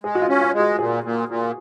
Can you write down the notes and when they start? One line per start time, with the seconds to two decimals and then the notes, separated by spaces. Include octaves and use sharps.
0.04 G#3 G#4
0.15 F#4
0.22 F4
0.29 C#4
0.41 F4
0.54 G#3
0.60 F#4
0.79 A#2 G#4
1.04 A#2
1.29 A#2